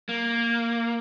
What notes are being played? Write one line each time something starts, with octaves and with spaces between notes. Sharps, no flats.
A#3